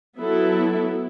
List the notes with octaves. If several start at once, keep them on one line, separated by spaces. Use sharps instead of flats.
F#3 B3 E4 A4